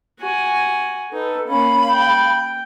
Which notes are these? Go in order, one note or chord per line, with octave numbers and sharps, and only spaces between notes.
F#4 G#5
D#4 A4 B4
A#3 C#4 F5 B5
G5